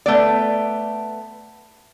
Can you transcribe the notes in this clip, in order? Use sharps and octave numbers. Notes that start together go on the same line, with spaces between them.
A3 B3 D5